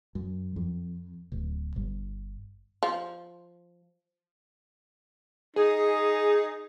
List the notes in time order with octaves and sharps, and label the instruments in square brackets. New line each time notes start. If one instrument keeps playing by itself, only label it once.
[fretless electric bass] F#2
F2
D1
G1
[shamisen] F3
[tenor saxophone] D#4 [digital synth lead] G#4